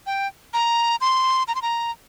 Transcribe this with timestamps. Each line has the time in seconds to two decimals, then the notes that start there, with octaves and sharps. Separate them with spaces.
0.06 G5
0.54 A#5
1.01 C6
1.48 A#5
1.55 C6
1.62 A#5